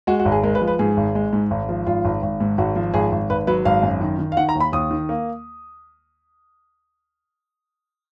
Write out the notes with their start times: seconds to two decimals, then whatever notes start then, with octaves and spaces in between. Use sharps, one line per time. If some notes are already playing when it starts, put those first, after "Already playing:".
0.07 G#3 F#4
0.20 F#4
0.25 G#1
0.32 G#4
0.43 G#3 A#4
0.55 B4
0.61 F3
0.67 B4
0.79 G#2 G#4
0.97 G#1
1.15 G#3
1.33 G#2
1.51 G#1
1.69 F3
1.87 G#1 F4
2.05 G#1
2.22 G#1
2.40 G#2
2.58 G#1 F#4
2.76 F3
2.94 G#1 G#4
3.12 G#1
3.30 G#1 B4
3.47 F#3 B4
3.65 G#1 F5
3.83 F#2
4.01 D#3
4.19 D#3
4.32 F5
4.37 D#3 F#5
4.49 A#5
4.55 D#2
4.60 B5
4.73 D#2 D#6
4.91 D#3
5.09 A#3